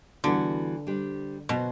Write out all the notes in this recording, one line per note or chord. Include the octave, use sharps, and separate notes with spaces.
D3 E3 G3 B3 F#4
G3 D4 G4 C5
B2 F#3 B3 F#4 C5